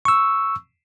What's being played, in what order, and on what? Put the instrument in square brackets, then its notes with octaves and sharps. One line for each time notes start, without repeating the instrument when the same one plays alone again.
[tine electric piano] C#6 E6